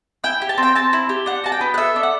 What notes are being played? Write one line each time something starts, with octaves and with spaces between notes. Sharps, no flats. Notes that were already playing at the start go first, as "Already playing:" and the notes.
E4 G5
G4
A5
C4
G5
C4 A5
E4
G4
D4 F#5
F#4 A5
G5
B3
F#5
A4 E5
D4
F#5